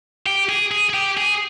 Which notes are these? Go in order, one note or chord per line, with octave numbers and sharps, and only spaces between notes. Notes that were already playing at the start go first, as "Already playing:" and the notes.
G4
G#4
G#4
G#4
G4
G#4